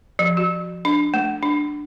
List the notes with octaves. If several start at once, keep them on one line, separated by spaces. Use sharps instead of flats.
F3
F#4
D4
A3
D4